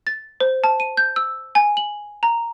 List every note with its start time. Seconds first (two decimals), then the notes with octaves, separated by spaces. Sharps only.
0.07 A6
0.40 C5
0.64 A5
0.80 D#7
0.97 G6
1.16 E6
1.55 G#5
1.77 F#7
2.23 A#5